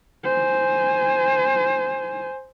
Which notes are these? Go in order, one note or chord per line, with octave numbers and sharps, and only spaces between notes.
C5 G#5